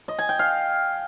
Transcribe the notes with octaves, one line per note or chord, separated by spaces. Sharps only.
D#5
G#5
G5
F5